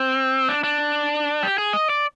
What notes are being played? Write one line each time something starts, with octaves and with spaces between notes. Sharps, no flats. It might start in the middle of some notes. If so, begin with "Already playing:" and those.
Already playing: C4
D4
D4
G4
G#4
D#5
D5